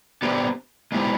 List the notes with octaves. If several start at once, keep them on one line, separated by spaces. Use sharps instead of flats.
B3 D4 G4 C5
G#3 B3 E4 G4 C5